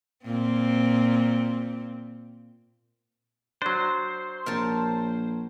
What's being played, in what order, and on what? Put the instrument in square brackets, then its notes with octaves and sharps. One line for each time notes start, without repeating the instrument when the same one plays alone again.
[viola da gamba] A#2 C4
[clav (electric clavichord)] F#3 D4 [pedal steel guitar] C5
[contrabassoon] A#1 [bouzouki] A#4 C#5 A5